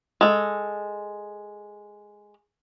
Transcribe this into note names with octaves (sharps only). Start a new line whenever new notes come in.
G#3 A4